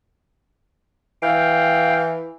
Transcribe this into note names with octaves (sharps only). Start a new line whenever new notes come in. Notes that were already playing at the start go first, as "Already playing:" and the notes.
E3 F5 G5